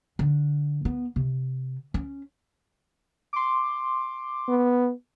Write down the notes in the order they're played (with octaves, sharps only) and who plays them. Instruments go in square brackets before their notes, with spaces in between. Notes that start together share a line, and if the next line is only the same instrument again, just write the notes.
[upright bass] D3
B3
C3
C#4
[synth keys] C6 D6
[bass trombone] B3